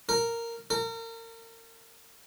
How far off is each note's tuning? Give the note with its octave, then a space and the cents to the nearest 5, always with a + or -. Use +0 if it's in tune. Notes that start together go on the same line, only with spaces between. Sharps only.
A#4 -10
A#4 -35